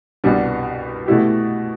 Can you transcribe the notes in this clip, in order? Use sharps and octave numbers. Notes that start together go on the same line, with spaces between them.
C2 B2 G3 B3 D4
B2 A3 E4 G4